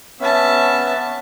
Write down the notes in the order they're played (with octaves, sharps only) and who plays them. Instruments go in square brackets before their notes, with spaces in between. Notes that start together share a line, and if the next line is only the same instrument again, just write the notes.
[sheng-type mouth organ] B3 C#4 [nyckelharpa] E5 A5